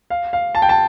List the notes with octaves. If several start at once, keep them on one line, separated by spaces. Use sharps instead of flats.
F5
F5
A5
G5
A5